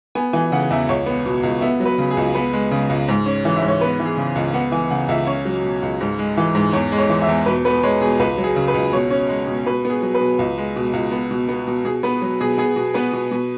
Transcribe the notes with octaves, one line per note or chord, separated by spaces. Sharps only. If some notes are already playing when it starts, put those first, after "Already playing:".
B3 G#5
E3 G#5
C#3 F#5
E2 E5
C#2 C#5
B3
B2
C#2
B3 E5
F#3
B4
C#3
G#4
C#2
B3 B4
G#3
C#3
C#2
G#2
C#4
E3
E5
G#2
C#5
B3 B4
E3
G#4
C#3
C#2
B3 F#5
E3 G#5
C#3 F#5
C#2 E5
C#4 C#5
F#3
B2
C#2
G#2
G#3
E3
G#2
E2 C#5
G#3
C#5
E3
E5
E2
B2 B4
B3 B4
G#3 C#5
B2 G#4
C#2 B4
F#3
G#4
C#3
B4
C#2
B2 C#5
C#4
G#3
B2
B2 B4
B3 G#4
F#3
B4
B2
C#2
G#3
B2
C#2
B3
B2
B3
B2
B2 G#4
B3 B4
F#3
B2 G#4
B3 G#4
B2
B3 B4
B2
B2